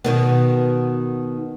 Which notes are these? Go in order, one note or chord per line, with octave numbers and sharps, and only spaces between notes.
B2 D#3 B3